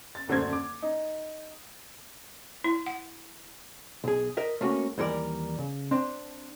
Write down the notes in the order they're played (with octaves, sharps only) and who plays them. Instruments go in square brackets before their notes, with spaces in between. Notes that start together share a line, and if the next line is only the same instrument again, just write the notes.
[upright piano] A6
D#1 F#2 D3 A3 C5 G#6
D6
D#4
[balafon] E4
F#5
[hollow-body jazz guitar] B1 G#4
A#4 D#5 E5
A3 A#3 C#4 F#4
D#2 E3 G3 A#4 D5
C#3
C4 D4